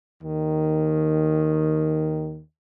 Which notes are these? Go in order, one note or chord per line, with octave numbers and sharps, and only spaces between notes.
D#2 D#3